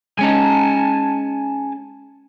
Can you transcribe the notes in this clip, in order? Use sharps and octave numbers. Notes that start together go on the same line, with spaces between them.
G#3 C#4 D#4 G#5 A5